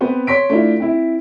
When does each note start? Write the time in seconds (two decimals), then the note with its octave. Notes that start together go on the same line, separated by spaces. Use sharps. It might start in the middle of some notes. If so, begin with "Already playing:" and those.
0.01 B3 C4 B4 C5
0.27 C#5 C6 B6 D7
0.50 A3 D4 E4 F4
0.80 C4 E4